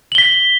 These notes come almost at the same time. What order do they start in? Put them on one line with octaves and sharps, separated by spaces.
F#7 G7 B6